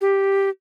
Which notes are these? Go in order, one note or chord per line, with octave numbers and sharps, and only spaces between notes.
G4